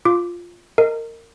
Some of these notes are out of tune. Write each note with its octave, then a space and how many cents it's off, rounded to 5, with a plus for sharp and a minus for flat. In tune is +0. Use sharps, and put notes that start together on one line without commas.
F4 +0 D6 +0
A#4 -25 D#5 +0